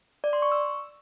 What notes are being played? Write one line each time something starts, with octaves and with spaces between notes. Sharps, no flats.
D5
C6
C#6
E6